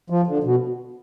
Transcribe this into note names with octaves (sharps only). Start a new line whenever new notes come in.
F3
D3
B2